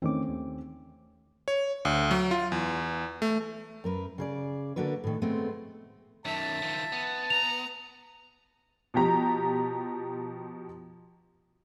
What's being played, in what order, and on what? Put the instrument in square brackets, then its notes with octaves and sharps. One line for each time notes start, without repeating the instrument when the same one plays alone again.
[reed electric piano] E2 D#3 D6 [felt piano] A3 C4 C#4
[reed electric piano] D#2
[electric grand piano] C#5
D2
F#3
F4
E2
A3
[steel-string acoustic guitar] F#2 A#4 B4
C#3 G#4 D5
D3 A#3 D4 F#4 B4
A2 D#3
G#3 A3 B3 C4
[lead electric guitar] F#2 D#3 [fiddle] E5 [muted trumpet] A5
[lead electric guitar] D#3 F3
B3
[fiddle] A#5 [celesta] F7
[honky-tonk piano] B2 F3 G4 A#5